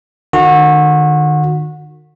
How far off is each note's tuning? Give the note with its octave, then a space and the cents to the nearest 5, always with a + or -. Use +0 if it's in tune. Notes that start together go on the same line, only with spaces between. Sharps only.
D#3 -40 F#4 -25